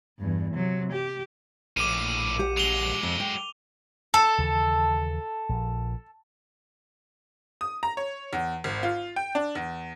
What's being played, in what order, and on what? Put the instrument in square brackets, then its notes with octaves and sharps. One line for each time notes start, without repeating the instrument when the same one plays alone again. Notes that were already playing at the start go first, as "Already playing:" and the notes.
[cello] E2 G2
C3 F#3
G4
[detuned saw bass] A#1 [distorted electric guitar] A2 F3 [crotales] D6 D#7
[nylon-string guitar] G4 F#5
[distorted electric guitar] F#3 G#3 [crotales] F7 G7
[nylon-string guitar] F2
G5
[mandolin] A4 [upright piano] A5
[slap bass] D#2 C#3 E3
A#1
[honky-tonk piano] D#6
A#5
C#5
E2
G#1
F4
G5
D4
E2